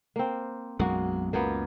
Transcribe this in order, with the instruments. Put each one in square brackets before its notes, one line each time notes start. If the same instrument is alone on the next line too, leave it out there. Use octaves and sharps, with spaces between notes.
[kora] A#3 C4
[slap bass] B1 F#2 G#3 [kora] A#3 F#4
[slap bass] C#2 F#2 [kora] A#3 B3